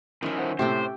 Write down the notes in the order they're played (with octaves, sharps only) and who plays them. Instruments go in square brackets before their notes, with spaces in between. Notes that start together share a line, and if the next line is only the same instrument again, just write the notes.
[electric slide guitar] D#3 F3 E4 [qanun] C#4 E5
[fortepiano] C5 F#5
[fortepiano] A2 C3 A3 [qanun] G4 E5 G5 [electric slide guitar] C5